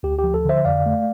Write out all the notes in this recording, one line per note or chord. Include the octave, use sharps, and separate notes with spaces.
D2 G4
G4
F3
A4
D3 C5 E5
F2 D5 F5
A3